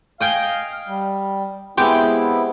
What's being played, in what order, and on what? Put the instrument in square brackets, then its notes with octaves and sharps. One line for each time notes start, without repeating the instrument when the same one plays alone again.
[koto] D#5 G5 G#5 [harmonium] F5
[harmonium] G3
[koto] G#3 C4 G4 [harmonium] B3 E4